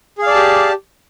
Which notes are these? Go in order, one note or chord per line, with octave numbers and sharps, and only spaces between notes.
G4 G#4 D5 F5 A5